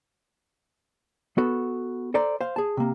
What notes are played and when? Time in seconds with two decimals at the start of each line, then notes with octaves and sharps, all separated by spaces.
1.38 B3 F#4 A4
2.14 A4 C5 D5 A#5
2.41 C5 F5
2.56 G#4 A5
2.77 C3 A#3